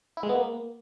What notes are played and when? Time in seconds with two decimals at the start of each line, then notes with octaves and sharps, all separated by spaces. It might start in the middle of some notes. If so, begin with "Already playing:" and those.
0.17 E4
0.23 G#3
0.29 B3
0.35 A#3